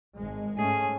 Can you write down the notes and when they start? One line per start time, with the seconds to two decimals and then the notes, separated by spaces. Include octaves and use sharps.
0.16 G#1 G#3
0.58 G#2 A3 C#4 G#4